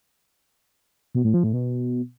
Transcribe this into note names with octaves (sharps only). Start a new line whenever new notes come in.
B2
A2
F3
A2
B2